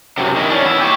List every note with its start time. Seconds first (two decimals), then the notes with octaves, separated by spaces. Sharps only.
0.18 F#2 C3
0.36 D#3 E4
0.50 C#4 D4
0.64 B3 E4
0.81 G4 C#5